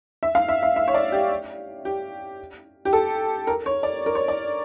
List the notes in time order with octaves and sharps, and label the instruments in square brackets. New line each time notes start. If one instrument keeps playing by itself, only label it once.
[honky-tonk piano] E5
F5
E5
E5
E5
C#5
D5
G4
G4
G4
A4
A#4
C#5
D5
A#4
C#5
D5